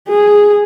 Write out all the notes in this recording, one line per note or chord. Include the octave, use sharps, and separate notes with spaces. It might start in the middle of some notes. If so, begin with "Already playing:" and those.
G#4